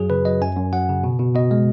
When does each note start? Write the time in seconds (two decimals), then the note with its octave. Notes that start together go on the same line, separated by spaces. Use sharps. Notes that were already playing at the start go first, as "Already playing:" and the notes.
Already playing: F#2 F#3 G#4
0.10 C#3 B4
0.25 F#3 D#5
0.41 F#2 G#5
0.56 F#2
0.73 F#3 F#5
0.89 C#3
1.04 B2
1.19 B2
1.35 B2 D#5
1.51 G#3